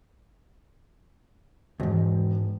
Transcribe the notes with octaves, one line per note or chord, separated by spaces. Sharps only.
E1 D#2 G#2